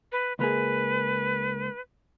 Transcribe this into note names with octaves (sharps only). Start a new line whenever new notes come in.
B4
C#2 A#3 G#4 B4